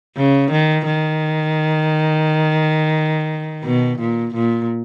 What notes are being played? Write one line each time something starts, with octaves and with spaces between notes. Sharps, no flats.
C#3
D#3
D#3
B2
A#2
A#2